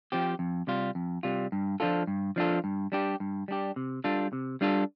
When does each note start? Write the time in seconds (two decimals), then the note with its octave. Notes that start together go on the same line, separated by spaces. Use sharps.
0.12 F3 C4 G4
0.39 F2
0.67 C3 G3 F4
0.95 F2
1.23 C3 G3 F4
1.52 G2
1.80 F3 D4 F4 A4
2.07 G2
2.36 F3 D4 F4 A4
2.64 G2
2.92 G3 D4 G4
3.20 G2
3.48 G3 D4 G4
3.76 C3
4.04 G3 D4 F4 A4
4.33 C3
4.61 G3 D4 F4 A4